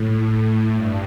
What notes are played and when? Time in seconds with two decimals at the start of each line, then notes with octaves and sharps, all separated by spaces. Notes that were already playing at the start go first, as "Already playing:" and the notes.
Already playing: A2
0.25 A2
0.75 G2